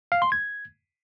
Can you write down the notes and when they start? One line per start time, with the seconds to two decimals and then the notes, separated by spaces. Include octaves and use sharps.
0.12 F5
0.22 C6
0.32 G#6